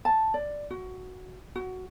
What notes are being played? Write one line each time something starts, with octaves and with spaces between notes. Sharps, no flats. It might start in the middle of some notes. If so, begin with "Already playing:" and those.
A5
D5
F#4
F#4